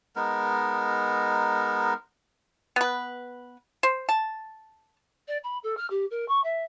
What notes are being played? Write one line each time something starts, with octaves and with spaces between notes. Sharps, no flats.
G#3 B3 D#4 A#4
B3 B4
C5
A5
D5
B5
A4
F6
G4
A#4
C#6
E5